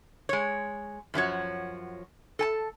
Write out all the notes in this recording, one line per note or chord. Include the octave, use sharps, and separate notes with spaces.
G#3 C#5
F#2 F3 F#4 C#5
A4 G#5 A5